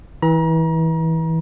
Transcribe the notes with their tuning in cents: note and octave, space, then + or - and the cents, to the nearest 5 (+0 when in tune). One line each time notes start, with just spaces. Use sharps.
E3 -25 A#5 +35